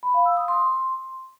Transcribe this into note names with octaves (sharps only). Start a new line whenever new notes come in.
B5
F5
E6
D#6
C6